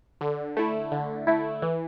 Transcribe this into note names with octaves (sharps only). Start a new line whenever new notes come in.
D3
A3 E4
D3
A3 E4
E3